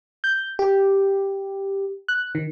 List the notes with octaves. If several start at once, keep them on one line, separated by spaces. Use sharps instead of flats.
G6
G4
F#6
D#3